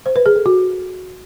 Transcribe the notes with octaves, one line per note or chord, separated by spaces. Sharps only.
C5
B4
G#4
A4
F#4